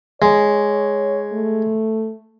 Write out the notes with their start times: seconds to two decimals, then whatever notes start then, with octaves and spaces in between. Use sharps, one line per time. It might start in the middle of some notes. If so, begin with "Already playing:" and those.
0.22 G#3 C#5
1.33 A3